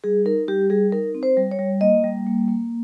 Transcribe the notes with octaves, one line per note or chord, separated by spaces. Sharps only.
G3 G#4
D#4 A#4
G3 G4
G3 G#4
D#4 A#4
C4
C5
G3
C#5
G3
A#3 D#5
G3
A#3
A#3